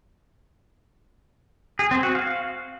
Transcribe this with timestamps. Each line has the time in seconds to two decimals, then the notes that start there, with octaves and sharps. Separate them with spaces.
1.79 G#4
1.91 C4
2.03 F#4
2.15 F5